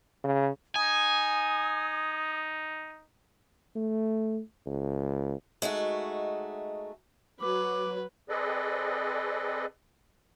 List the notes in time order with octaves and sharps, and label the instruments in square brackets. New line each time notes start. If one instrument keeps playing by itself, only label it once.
[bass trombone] C#3
[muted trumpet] D#4 [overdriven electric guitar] G#5 [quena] D#6
[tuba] A3
C#2
[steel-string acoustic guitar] G#3 A3 D#4 F#4
[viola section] F#3 [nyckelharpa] B4 [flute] D6
[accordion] C4 G#4 A4 B4 D5 D#5